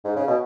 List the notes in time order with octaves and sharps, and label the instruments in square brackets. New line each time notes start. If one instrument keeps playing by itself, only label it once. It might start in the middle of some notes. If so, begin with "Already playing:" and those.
[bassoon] G#2
C#3
B2